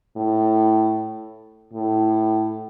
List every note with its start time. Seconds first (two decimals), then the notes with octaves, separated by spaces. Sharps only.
0.16 A2
1.73 A2